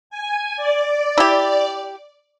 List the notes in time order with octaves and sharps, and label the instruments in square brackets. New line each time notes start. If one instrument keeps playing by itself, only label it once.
[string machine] G#5
D5
[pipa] E4 G4